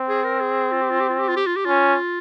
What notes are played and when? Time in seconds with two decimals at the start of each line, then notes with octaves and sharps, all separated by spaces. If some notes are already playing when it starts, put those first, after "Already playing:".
Already playing: C4
0.08 G#4
0.24 A#4
0.41 G#4
0.72 F4
0.81 G4
0.90 F4
1.00 G4
1.09 F4
1.19 G4
1.28 F4
1.36 G4
1.47 F4
1.56 G4
1.65 C#4 F4